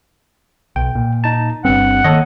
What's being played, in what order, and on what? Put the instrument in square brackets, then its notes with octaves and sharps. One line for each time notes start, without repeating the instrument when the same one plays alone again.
[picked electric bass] B1 [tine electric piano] G5
[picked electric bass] A#2
[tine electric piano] D#4 A5
[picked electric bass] G1 C4 [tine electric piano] G2 [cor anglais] F#5
[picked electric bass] D#3 A#3 [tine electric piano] A4 C#5 D#5